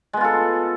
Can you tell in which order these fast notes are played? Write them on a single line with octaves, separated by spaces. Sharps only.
G#3 B3 F4 A4